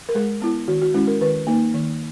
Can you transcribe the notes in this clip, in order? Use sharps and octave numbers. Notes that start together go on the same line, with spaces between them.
A#4
G#3 G#4
B3 E4
D#3 F#4
F#4
G#3 C#4 E4
A#4
D#3 B4
A#3 D#4
D#3